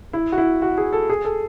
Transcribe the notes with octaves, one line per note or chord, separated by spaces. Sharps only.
E4
F#4
E4
F#4
G#4
A4
G#4
A4